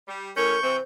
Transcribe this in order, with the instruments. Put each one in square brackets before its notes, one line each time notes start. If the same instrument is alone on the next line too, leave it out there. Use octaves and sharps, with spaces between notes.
[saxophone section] G3
[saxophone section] A2 C#4 C#5 [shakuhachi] A#4 [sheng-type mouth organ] C#6 G6
[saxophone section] C3 E3 C4 [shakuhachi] C5